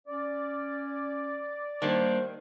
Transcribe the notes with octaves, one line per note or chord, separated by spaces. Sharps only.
C#4 D5
D#3 G3 A#3 D4 C5